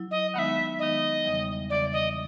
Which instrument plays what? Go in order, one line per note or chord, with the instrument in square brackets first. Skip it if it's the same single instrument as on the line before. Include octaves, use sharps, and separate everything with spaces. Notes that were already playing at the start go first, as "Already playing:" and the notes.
Already playing: [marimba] F#3 E4
[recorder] D#5
[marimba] D#3 G#3 B3 D#4 [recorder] E5 F#5
[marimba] D#3 G#3 B3 D#4 [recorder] D#5
[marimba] E2 C#3 E3 G3
[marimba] E2 C#3 E3 G3 [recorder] D5
[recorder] D#5